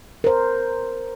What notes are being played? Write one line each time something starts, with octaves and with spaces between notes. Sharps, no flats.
A#4 C5